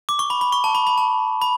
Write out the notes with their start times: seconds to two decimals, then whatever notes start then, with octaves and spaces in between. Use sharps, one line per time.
0.09 D6
0.19 C#6
0.30 B5
0.41 B5
0.52 C#6
0.64 A5
0.75 B5
0.87 B5
0.97 A5
1.42 B5